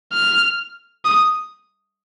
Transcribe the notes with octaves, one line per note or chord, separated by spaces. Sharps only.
F6
D#6